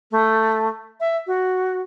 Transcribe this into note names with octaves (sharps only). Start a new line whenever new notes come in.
A3
E5
F#4